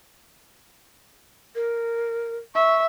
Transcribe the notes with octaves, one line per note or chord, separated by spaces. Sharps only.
A#4
E5 C#6